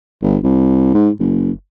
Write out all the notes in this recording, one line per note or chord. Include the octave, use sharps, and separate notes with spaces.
G1
C2
G#2
F#1